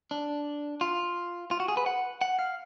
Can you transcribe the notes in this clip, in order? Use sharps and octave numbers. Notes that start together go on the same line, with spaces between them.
D4
F4
F4
F#4
G#4
B4
F#5
F#5
F5